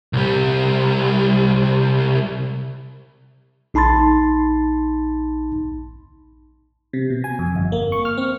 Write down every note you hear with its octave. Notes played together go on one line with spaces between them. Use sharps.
C2 G3
A#1 D#4 A5 B5 C6 A6
C3
B2
G#5
F2
G1
A#3
C#6
F6
C4